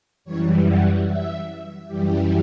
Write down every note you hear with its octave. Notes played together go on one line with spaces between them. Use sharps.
F#2 E3 G3 C#5
F#5
E5
F#2 E3 G3 G4